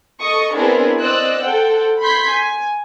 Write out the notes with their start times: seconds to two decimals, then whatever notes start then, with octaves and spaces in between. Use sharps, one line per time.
0.21 A4 D#5 C#6 D#6
0.53 B3 C4 D4 E4 G#4 A#4
1.00 C4 C5 D5 D#5 E6 F#6
1.41 A4 C5 F#5 G5
2.00 B5 C6 G6 G#6 B6
2.32 G#5